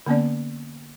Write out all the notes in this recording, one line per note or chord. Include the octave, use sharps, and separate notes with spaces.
D3 A#3 B3 C#4 D5